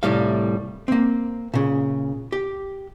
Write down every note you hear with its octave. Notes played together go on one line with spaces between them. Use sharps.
C2 A2 G3 F5
A#3 C4
A#2 C#3
G4